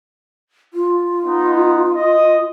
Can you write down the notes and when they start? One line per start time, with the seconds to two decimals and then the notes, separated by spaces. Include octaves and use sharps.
0.73 F4
1.24 B3 D#4
1.95 D#5